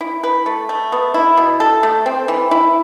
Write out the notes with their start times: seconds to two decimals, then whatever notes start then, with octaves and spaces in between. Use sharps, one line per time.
0.01 E4
0.23 B4
0.46 A3
0.69 A3
0.92 B3
1.14 E4
1.37 B2
1.60 A4
1.83 A3
2.06 C4
2.28 E3
2.51 E4